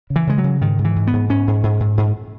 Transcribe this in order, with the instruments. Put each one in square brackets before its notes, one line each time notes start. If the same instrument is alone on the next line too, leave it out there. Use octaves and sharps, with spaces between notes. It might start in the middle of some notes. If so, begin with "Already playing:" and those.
[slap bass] C#3
E3
C#3 G#3
F#3
C#3
G#2 D#3
G#2
E3
G#2
B3
G#2
G#2 C#4
G#2
G#2
G#2
G#2